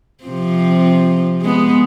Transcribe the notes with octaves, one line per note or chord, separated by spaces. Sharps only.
C3 F3 C4
G#3 B3